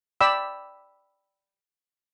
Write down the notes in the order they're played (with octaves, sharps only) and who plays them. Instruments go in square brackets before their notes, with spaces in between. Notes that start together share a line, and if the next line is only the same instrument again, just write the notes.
[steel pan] D5 G5 B5 D6 E6